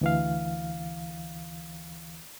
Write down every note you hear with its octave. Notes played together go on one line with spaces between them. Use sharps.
D2 E3 F5